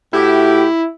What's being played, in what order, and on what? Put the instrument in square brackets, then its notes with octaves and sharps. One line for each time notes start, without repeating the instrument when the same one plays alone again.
[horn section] A2 F#4 G4 [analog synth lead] E4